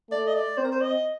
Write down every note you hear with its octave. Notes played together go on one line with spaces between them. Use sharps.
A3 D5
D#5
D5
C4 C5
A#4
C5
D#5